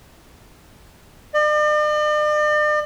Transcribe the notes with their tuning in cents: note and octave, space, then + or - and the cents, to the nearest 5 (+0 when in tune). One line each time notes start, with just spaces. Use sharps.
D5 +45